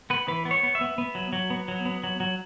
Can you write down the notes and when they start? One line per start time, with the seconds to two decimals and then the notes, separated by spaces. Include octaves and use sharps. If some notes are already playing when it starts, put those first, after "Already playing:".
0.10 B3 B4
0.28 E3 B4
0.45 B3
0.51 C#5
0.63 B3
0.75 E5
0.81 B3
0.98 B3
1.15 F#3
1.33 F#3
1.50 B3
1.68 F#3
1.85 B3
2.04 F#3
2.20 F#3